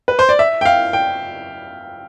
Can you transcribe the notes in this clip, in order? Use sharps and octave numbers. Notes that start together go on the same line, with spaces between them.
B4
C5
D5
E5
G5
F5
G5